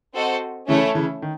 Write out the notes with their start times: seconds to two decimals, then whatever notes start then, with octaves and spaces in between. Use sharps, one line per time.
0.14 C4 F#4 A4 C5 D#5
0.68 C#3 E3 A3 C#4 E4 A4 C#5
0.95 C#3 E3
1.22 D#3